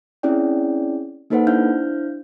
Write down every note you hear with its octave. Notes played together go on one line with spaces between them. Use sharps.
C4 C#4 E4 G#4 D5 G5
A#3 D#4 A4 B4 C5 F#5
D4 E4 C5 F5 F6 G6